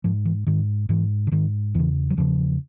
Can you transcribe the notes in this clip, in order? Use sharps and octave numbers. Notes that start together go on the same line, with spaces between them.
G#2 F3
E3
G#2 D#3
G#2 E3
D3
G#2 D#3
E2 C#3 E3
F#3
E2 C#3 F3